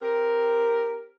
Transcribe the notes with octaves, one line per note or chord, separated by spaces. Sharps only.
C4 G4 A#4